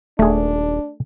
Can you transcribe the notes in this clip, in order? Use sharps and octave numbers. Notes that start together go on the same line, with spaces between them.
D#1 A3 D4 G#4